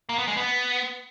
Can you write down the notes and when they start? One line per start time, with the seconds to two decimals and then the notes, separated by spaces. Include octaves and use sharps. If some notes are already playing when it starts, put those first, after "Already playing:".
0.09 A#3
0.18 B3
0.28 G#3
0.37 B3